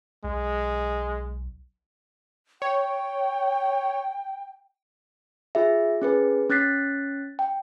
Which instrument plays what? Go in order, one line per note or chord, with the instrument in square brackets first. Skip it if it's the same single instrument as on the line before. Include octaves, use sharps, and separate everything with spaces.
[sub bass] B1 [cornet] G#3
[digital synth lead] C#5 [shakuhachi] G5
[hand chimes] F4 G#4 E5
C#4 G#4 B4
C#4 F#6 A6 B6 C7
G5